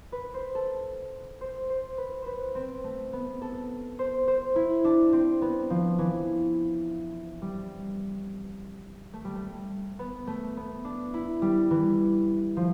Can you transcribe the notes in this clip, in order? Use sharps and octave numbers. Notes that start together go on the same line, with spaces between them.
B4
C5
A4
C5
C5
B4
B4 C5
C4
A3
B3
A4
C5
C5
E4
D4
C4
B3
F3
E3
G3
A3
G3
A3
B3
A3
B3
D4
E4
G3
E3
F3